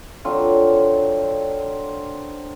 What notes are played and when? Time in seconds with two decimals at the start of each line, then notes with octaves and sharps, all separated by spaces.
0.25 D3 F#3 C4 F4